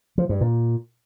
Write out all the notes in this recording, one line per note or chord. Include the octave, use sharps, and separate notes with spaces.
F3
G2
A#2